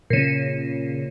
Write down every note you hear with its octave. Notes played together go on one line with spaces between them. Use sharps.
A#2 C#3